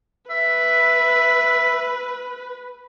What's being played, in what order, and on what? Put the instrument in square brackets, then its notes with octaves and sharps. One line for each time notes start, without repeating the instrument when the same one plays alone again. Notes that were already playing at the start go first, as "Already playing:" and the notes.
[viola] B4 [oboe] E5